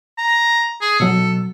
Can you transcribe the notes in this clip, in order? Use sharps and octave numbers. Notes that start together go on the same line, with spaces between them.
A#5
G#4
B2 F#3 A4